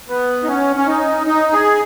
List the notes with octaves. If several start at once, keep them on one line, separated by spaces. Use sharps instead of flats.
B3
D#4
C#4
C#4
D#4
D#4
G#4